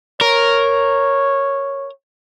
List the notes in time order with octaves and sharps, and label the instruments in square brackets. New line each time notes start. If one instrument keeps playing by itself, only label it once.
[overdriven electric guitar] A#4 [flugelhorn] C#5